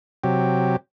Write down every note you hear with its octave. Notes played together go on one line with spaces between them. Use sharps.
C3 F#3 G4